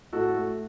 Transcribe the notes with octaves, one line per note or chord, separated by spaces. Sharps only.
A2 F#4 A4
A3